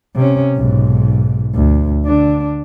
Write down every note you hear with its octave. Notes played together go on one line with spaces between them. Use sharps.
C3 C#4
B1 G#2
D2
D3 D4